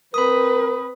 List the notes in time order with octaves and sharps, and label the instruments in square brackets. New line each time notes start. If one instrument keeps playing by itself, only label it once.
[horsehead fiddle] C4 B4 [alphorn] A#4 [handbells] B5 D#6